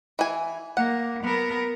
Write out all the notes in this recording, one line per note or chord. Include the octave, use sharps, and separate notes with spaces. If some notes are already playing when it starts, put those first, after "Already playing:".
E3 G#5
A#3 F#5
B3 A#4